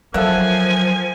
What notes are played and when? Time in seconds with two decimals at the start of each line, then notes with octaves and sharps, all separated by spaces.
0.14 F3 F#3 A#3 A4 E5 F#5 G#5 F#6